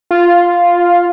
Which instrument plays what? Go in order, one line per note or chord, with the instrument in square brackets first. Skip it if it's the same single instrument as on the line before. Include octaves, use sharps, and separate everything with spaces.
[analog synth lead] F4